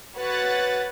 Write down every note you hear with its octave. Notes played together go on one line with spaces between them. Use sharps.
F#4 B4 C#5 F#5 F#6 A6